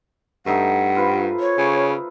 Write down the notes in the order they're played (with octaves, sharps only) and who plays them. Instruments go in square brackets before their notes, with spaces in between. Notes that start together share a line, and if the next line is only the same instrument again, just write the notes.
[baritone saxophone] G2 [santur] A3 D#4 A4 [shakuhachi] F#5
[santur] F4 B4 C5
[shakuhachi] C#5
[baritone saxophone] C#3